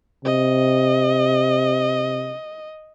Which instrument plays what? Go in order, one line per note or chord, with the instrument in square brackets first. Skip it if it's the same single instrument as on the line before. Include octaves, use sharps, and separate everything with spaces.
[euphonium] C3 [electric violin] D#5